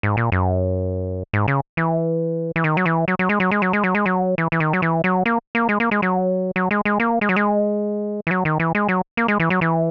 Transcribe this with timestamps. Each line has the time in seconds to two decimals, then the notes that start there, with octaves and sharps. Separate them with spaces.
0.03 G#2
0.17 A#2
0.32 F#2
1.33 G#2
1.48 C#3
1.77 E3
2.56 E3
2.64 D#3
2.77 F#3
2.86 E3
3.08 F#3
3.19 F#3
3.29 G#3
3.40 F#3
3.51 G#3
3.62 F#3
3.73 G#3
3.84 F#3
3.95 G#3
4.06 F#3
4.38 E3
4.52 E3
4.60 D#3
4.73 F#3
4.82 E3
5.04 F#3
5.26 A#3
5.55 A#3
5.69 G#3
5.80 A#3
5.91 G#3
6.02 F#3
6.56 F#3
6.71 G#3
6.85 G#3
7.00 A#3
7.21 G#3
7.29 F#3
7.36 G#3
8.27 E3
8.31 F#3
8.45 D#3
8.60 E3
8.75 G#3
8.89 F#3
9.17 A#3
9.28 G#3
9.40 E3
9.50 F#3
9.61 E3